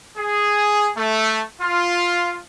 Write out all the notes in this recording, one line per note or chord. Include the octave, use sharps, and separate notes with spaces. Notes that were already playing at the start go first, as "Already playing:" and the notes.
G#4
A3
F4